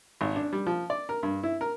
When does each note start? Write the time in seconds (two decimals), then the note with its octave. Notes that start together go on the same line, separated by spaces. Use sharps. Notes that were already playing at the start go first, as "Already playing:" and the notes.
0.21 G#1
0.36 D4
0.53 G3
0.67 F3
0.90 D5
1.09 A#4
1.23 G2
1.43 E4
1.61 A#4